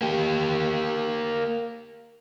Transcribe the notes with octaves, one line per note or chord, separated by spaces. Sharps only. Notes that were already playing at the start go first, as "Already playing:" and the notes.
A#3 G4